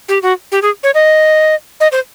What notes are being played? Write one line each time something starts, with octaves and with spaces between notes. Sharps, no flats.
G4
F#4
G4
G#4
C#5
D#5
D#5
C5